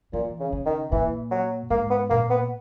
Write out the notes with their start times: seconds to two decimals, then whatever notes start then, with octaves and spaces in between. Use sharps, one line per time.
0.13 A#2 E3
0.40 C#3
0.53 C#3
0.66 D#3
0.92 A#2 E3
1.31 F#3
1.70 G#2 A#3
1.90 B3
2.10 A#2 A#3
2.30 B3